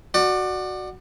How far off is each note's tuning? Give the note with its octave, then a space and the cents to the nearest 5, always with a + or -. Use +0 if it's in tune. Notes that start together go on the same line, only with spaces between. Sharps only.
F#4 +0 D5 +25